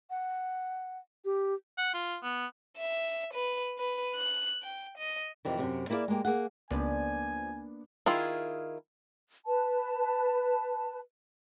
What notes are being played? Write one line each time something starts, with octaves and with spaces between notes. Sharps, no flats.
F#5
G4
F#5
F4
B3
E5
B4
B4
F#6
G5
D#5
F2 C3 D#3 E3
F#2 A2 C3
A#3 E4 G#4 A4 D5 F5
G#3 A#3 G4
A#3 G#4 F#5
C#2 F3 A#3 B3 D4 B4 D5 G#5
D#3 E4 F4 G#4
B4 A5